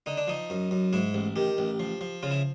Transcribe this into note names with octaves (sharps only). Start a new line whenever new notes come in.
D3 D#4
D4
F3 D#4
F#2
F#2
G#2 E4
A1
D#3 G4
A1
F3
F3
C#3 F4
E4